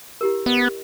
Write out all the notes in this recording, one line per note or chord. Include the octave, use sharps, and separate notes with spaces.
E4 G4 A#4
B3 D#5